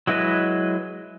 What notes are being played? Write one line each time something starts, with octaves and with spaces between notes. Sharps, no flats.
F#3 G#3 E4 B4 D#5